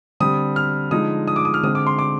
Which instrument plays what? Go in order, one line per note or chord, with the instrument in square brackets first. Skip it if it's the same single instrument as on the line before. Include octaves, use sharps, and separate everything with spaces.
[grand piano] D3 G3 C4 D#6
F6
D3 F3 G#3 D#4 D#6
D#6
D6
D#6
F6
D3 G#3 C4 D#6
D6
C6
D6